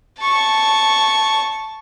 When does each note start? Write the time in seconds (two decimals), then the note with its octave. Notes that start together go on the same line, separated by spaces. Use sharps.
0.20 A5 C#6